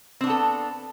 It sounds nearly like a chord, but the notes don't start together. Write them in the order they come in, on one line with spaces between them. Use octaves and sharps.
C4 D4 B3 A4